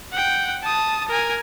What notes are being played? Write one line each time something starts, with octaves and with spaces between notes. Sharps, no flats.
F#5 G5
A5 D#6
A#4 G#5